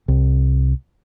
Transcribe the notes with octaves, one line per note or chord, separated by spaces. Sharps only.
C2